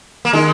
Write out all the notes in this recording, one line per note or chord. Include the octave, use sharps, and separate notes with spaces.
A#3
D#3 G#3